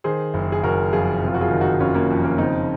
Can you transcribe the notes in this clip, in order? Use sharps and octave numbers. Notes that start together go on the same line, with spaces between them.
D#3 G#4 C5
F#1
G#4
F#1 F#4 A#4
F2 F4 G#4
C3
F4
F#4
F4 G#4
D#3
D#4 F#4
F#1 C#4 F4
A#3 C#4
F2
A#3 C#4
C#3 C4 D#4